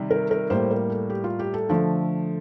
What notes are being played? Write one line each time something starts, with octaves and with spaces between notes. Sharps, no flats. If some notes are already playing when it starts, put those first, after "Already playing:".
Already playing: C3 D#3 G3
A#4
A#4
A2 G3 A#3 C5
A#4
A4
G4
F4
G4
A4
D3 F3 A3